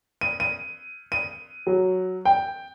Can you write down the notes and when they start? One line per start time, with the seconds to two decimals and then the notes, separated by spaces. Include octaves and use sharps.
0.21 D#7
0.40 D#7
1.12 D#7
1.67 F#3
2.25 G5